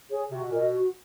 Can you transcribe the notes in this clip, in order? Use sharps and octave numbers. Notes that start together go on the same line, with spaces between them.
G#4 C#5
C3 F#4
B2
A#2 A#4 D#5
B2
F#4